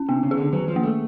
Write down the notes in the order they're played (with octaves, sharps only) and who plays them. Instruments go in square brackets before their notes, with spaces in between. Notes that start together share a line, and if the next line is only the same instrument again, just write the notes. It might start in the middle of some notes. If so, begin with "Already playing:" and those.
Already playing: [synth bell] C#4
[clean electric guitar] C3 [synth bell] B3
[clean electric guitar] C#3
[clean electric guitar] D#3 [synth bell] G#4
[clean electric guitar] D3
[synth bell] D#3 [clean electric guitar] F#3
[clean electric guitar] F3
[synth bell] A#3
[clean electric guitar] A3